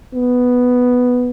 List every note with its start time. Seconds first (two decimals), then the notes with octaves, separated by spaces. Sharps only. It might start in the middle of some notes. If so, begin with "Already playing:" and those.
0.14 B3